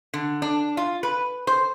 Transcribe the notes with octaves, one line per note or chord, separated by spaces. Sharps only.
D3
D4
F4
B4
C5